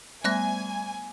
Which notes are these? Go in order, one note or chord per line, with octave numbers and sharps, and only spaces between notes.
G3 A3 B3 E5 G#5 F#6 A#6